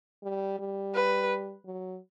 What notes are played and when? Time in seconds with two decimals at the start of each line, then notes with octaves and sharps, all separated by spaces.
0.23 G3
0.59 G3
0.94 B4
1.65 F#3